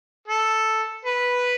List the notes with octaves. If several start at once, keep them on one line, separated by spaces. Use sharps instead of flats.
A4
B4